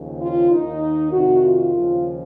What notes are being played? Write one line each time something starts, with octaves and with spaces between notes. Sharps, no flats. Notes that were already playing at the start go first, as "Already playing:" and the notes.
Already playing: D#2 C#3 F3
F4
D#2 D#3 D#4
F2 C3 D#3 F#4
F4
D#2 C#3 F3